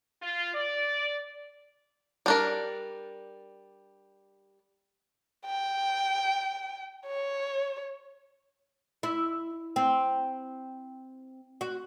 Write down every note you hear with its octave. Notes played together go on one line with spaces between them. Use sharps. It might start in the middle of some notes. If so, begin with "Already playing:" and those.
F4
D5
G3 D4 A#4
G5
C#5
E4
C4
F#4